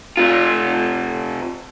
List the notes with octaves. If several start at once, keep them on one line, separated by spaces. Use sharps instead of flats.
C3 F4